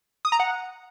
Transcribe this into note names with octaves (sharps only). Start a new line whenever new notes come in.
D#6
A#5
F#5